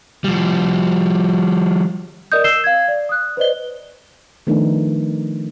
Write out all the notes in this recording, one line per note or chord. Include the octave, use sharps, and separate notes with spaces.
F3 G3
A#4 D5 D#5 D#6 G6
E6 G6 C7 E7 G7
F5 G#6
D5
D#6 F#6
B4 C5 D5 D#5 G7
D#3 F3 A3 B3 D4 D#4